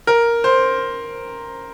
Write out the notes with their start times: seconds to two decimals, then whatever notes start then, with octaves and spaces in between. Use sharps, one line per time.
0.07 A#4
0.44 C5